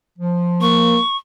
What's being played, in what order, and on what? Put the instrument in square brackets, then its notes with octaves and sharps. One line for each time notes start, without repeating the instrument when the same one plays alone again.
[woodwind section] F3
[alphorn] A#3 [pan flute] C#6